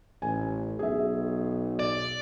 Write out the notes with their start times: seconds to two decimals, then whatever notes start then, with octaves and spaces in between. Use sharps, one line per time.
0.22 A1 G#5
0.79 B1 G#4 E5
1.79 D5